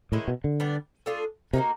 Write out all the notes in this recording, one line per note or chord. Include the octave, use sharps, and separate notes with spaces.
A2 D#3 G#3 C#4 E4
B2
D3
G3 B3 D4
A3 D4 F4 G#4
C3 A#3 D#4 F#4 A#4